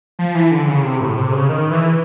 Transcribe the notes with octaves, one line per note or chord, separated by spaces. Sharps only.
F3
E3
D3
C#3
C3
A2
C3
C#3
D#3
E3